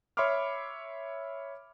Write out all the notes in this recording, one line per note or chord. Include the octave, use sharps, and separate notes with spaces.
C#5 E5 B5 C6 D6 F6